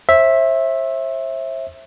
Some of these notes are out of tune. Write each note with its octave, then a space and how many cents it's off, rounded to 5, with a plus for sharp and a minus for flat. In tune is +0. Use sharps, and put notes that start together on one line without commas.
C5 +40 E5 -5